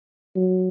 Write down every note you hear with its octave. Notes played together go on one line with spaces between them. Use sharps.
F#3